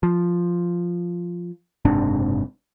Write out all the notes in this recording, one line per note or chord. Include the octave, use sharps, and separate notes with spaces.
F3
F#1 G#2 C3 D4